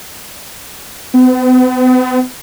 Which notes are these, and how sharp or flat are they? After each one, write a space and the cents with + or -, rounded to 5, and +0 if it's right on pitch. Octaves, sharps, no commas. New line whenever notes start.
B3 +45